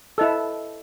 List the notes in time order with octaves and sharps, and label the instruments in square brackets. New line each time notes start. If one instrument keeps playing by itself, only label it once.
[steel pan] E4 A4 [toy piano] C5 D#5 E6